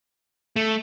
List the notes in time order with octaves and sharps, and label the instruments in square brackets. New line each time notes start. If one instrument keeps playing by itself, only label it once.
[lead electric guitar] A3